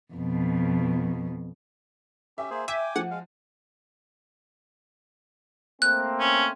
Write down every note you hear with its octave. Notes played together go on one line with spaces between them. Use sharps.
F2 B2
C#4 G4 E5
A#3 G#4 C5
E5 G5 G#5 D6 D#7
F3 F#5
G#3 F5
A3 A#3 C4 F#6
C#4